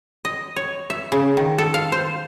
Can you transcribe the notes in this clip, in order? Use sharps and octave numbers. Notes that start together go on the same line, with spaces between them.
D#5
C#5
E5
C#3
D#3
A4
F5
C5